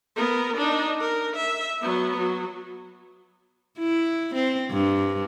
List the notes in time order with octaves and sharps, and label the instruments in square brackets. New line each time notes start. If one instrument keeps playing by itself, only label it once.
[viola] B3 A#4
D4 D#4
A#4
E5
F#3 B3
F#3
[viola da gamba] E4
C4
G2